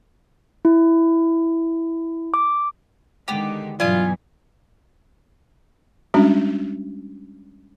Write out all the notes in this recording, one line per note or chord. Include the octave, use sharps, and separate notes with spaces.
E4
D6
D3 D#3 G#3 B3 G4
G2 B2 E3 F#3 F4 D5 G#5 D#6
G3 G#3 C#4 D4 F#4